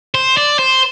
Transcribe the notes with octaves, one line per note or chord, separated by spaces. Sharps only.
C5
D5
C5